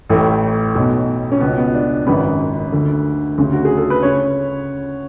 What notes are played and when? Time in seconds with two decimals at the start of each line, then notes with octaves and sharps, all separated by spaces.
0.10 A1 A2 A3
0.76 B1 B2
1.32 C#4
1.40 C#2 B2 B3
1.58 B3
1.74 D4
2.07 G#1 F#2 C#3 B4
2.72 D2 D3
3.38 D2 C#3
3.53 F#4
3.65 G#4
3.77 A4
3.90 B4
4.02 C#3 C#5